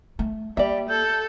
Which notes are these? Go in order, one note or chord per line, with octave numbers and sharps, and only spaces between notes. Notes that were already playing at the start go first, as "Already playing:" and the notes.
A3
G3 A#3 D5 E5
A4 G6